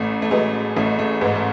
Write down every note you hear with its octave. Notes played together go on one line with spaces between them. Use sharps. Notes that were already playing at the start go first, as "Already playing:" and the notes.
Already playing: A1 A3
A3
F#3 G#3 B3
A1 A3
A3
G#2 G#3 B3
A3